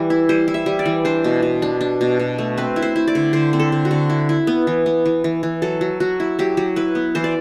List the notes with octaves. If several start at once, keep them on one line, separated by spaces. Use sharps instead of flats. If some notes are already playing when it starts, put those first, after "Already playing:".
Already playing: E3 G3 B4
E4
G3 C5
E4
E5
G3
D5
E3
D4 C5
B2
B2
D4
D4
B2
B2
A3
C4 B4
E4
C5
E4
D5
D3
D3 C5
C4
A4
D3
F#4
D3
E4
E4
B3
E3
B3
E3
E3
E3
F#3 A4
F#3
F#3 F#4
E4
F#3 G4
F#3
E4 B4
B3
E3 C5
D5